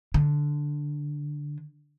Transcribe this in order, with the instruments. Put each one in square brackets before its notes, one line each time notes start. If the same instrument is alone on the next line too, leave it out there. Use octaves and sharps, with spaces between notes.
[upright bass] D3